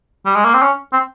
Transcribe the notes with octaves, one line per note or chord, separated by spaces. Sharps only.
G3
G#3
A#3
C4
C#4
C4